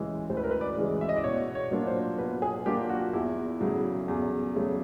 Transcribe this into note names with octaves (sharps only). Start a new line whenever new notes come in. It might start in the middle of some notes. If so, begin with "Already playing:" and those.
Already playing: D2 C#3 E3 G#3
D2 C5
B4
A#4
B4
D5
C#3 E3 G#3
E5
D#5
D5
B2 C#5
C#5
F#3 A#3 D4 F4
C5
B2 B4
G#4
F#3 A#3 D4 F4 G4
F#4
E2 E4
C#3 F#3 A3
E2
C#3 F#3 A3